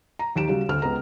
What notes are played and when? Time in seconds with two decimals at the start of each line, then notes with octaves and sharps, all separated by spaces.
0.19 A#5
0.36 D#2 G4 D7 E7
0.48 C#3 G3 F#4
0.69 D2 F6
0.82 C#2 B3 A#5